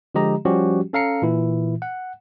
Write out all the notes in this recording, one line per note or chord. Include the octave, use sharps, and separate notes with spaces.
D3 F3 G#3 G4 D#5 A#5
F3 G3 C#4 F#4 G4
C#4 A4 F5 A#5 C7 C#7
A#2 E3 E4
F#5